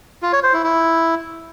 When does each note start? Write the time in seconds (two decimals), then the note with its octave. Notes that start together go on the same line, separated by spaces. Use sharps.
0.22 F4
0.33 C#5
0.43 C5
0.54 E4
0.64 E4